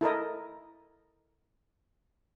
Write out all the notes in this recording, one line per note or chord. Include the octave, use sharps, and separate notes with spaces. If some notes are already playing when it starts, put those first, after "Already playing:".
E4 A4 A#4 D#5